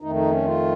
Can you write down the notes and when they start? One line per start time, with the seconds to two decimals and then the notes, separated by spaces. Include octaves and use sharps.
0.01 F2 D#3 A3 D#4
0.15 D#4
0.31 C#4
0.46 F4